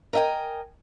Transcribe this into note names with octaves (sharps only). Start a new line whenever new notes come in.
A#4 D#5 E5 G5 G#5